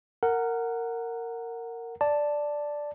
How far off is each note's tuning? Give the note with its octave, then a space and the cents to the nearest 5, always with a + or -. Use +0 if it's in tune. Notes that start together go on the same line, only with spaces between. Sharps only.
A#4 -15 F#5 +0
D5 +0 A5 +0